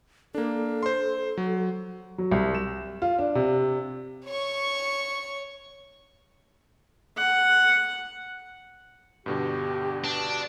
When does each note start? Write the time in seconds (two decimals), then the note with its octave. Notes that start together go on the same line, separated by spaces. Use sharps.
0.35 A#3 D4 A4
0.83 C5 C6
1.37 F#3
2.18 F#3
2.31 C2
2.55 E7
3.02 F4
3.19 D4
3.35 C3
4.25 C#5 C#6
7.17 F#5
9.26 G2 B2 D3 G4
10.04 D4